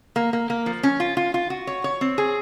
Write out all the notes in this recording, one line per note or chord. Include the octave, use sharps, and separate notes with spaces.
A#3
A#3
A#3
F3
C#4
F4
F4
F4
F#4
C#5
C#5
C4
G#4